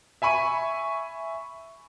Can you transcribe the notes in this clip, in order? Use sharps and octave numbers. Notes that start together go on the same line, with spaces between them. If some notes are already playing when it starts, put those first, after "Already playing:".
E5 G#5 B5 C#6 D#7